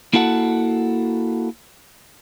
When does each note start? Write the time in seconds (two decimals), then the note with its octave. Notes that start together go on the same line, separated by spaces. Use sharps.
0.13 A#3 E4 F#4 A4 F#5